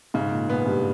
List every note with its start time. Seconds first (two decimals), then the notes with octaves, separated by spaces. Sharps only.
0.14 G#2 C#3
0.31 A#2
0.48 A#2 B3
0.66 G2